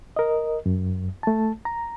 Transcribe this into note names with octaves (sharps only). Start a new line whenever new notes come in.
A#4 D#5
F#2
A3 A5
A#5